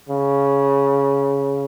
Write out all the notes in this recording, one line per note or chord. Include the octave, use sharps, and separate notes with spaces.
C#3